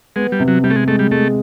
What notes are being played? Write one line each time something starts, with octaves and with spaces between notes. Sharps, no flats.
G#3 B3
G3
C3
F#3
C3 G3
A3
G#3
G#3 A3
G3
G#3 A3